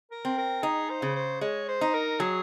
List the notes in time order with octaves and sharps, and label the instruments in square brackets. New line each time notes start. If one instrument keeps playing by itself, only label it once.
[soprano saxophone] A#4
[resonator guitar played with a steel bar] C4
[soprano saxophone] A#4
[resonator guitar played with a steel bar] D#4 [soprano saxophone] G#4
[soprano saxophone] C5
[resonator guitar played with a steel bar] C#3
[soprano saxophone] C5
[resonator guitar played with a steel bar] G#3 [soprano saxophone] C#5
[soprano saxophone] C5
[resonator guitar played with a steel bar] D#4
[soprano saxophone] A#4
[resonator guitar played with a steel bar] F#3 [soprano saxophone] G#4